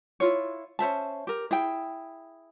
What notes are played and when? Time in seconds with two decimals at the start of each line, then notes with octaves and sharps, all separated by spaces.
0.20 E4 F4 C#5
0.79 C#4 C5 E5 A5
1.27 G4 A#4
1.51 E4 G#4 G5